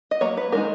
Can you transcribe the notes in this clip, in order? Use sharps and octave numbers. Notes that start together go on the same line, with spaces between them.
D#5
F#3 A#3 C#5
B4
D#3 G#3 D#4 A#4